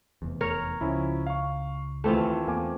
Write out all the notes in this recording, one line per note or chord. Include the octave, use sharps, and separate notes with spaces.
F1 E2
A#4 C#5
C#2 F3 C#4 E4
F5 C#6
D#2 E3 A3 C4 F4
E2 A#3 G#5 D6